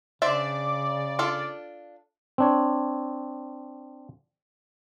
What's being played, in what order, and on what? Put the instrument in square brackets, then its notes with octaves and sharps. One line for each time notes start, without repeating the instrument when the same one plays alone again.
[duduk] C#3 [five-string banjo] D4 C5 E5 [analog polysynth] D5
[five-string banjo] D4 F4 A4
[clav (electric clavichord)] C4 D4 C#5